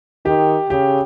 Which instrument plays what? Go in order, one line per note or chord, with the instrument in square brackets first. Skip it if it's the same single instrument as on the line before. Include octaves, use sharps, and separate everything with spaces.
[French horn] D#3 [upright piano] G4
[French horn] C#3 [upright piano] G4